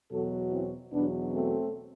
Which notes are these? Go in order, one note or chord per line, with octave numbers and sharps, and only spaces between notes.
E2 B2 F#3 F#4 A4
C4 E4
E2 B2 F#3 B3 D4
A3 C4